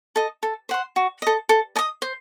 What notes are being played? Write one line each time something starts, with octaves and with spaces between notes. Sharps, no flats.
A4 D#5
A4
C5 F#5 C6
F#4
A4 D#5
A4
D#5 A5 D#6
C5